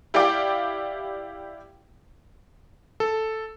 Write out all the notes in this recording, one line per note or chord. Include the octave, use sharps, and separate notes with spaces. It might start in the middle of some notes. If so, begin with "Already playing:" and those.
E4 G4 D5 F5 G5 D6
A4